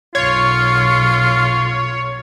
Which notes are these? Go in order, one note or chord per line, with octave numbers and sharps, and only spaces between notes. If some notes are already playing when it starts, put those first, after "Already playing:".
B1 F#2 F4 C#5